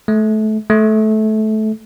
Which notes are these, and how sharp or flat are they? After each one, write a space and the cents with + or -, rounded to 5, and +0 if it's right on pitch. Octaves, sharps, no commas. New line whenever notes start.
A3 -25
A3 -20